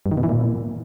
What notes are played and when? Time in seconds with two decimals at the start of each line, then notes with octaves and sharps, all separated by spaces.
0.06 G2
0.12 D#3
0.17 B2
0.23 E3
0.29 A#2